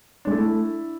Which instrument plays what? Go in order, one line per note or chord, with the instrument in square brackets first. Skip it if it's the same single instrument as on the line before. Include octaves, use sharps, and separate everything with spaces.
[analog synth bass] G#3 [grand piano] D4
[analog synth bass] A3 [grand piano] E4